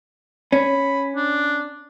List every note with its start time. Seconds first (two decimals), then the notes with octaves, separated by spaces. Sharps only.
0.52 C#4 B5
1.16 D4